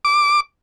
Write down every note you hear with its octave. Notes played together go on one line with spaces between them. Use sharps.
D6